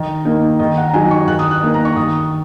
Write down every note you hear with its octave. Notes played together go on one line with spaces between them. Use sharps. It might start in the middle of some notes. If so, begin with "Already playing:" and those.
Already playing: D#3 D#5
A#3 D#4
D#3 D#5
F#5
A#5
F#3 D#4 G#5
C#6
D#3 F#6
D#6
F#6
A#3 D#4
A#5
C#6
D#3 D#6